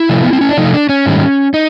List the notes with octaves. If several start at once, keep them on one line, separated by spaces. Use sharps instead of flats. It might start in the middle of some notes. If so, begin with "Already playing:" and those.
Already playing: E4
C3 F3 A3
B3
C4
C#4
D4
C3 F3 A3 D#4
D4
C#4
G#2 D#3 G3
D#4